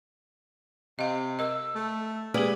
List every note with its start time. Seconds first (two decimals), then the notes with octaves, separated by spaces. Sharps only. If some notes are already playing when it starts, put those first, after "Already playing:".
0.99 C3 D#5 F5
1.39 A#4 D#5 E6
1.75 A3
2.34 G#3 A#3 G4 G#4 B4 D5